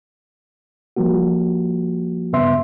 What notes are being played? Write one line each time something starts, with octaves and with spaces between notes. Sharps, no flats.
F3 G3 A#3 F#4
G2 C#3 B3 E5 C6